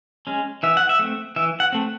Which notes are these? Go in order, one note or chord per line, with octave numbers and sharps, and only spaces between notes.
G#3 C#4
E3 E5
F#5
E5
A3 C4
E3 E5
F#5
A3 C4